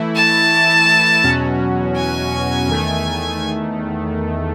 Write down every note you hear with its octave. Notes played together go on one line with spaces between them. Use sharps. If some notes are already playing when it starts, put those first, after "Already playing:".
Already playing: E3 A3 E4
A5
E2 B2 F#3 C#4 F#4
G#5
E2 D#3 A3